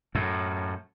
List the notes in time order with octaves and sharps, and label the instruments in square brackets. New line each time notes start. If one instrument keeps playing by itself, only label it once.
[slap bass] F#2 A2